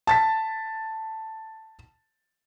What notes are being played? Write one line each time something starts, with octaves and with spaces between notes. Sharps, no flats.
A5 A6 B6